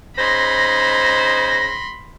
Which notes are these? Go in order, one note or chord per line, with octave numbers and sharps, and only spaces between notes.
C#3 D#4 C5 B5 C6 A#6